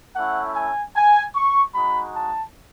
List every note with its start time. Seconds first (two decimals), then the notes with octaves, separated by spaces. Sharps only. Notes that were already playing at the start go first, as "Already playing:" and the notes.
0.15 A3 C#4 E4 F#5
0.55 G#5
0.95 G#5
1.35 C#6
1.75 G#3 D#4 F#4 B5
2.15 A5